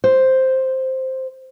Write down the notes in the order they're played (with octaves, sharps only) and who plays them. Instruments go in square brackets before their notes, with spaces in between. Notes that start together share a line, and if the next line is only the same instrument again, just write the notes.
[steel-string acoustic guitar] C5